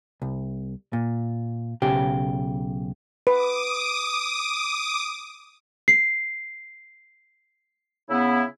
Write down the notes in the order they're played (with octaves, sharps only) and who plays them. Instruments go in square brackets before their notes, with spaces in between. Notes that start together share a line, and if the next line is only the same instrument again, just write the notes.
[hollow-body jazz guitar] C2
A#2
B1 C#3 G4
[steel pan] B4 [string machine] D6 D#6
[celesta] C7
[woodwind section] C#3 B3 E4